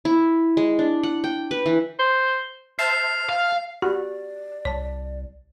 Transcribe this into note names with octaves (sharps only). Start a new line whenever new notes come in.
E4
G#3
D4
F#5
G5
B4
E3
C5
C5 E5 A5 F6 C7
F5
F#4 G4 D5
C2 C#5 A5